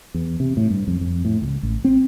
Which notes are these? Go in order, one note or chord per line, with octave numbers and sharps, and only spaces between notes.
E2
C3
A2
G2
F2
F2
A2
C#2
A1
C4